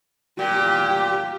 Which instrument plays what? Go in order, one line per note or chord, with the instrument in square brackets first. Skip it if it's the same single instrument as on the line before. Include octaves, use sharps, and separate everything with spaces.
[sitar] A#2 [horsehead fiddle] G4